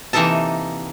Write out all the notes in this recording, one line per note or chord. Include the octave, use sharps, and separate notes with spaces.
C3 E3 A#3 D#4 A4 A5